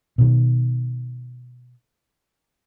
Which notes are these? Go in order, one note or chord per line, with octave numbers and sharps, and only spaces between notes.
B2 D#3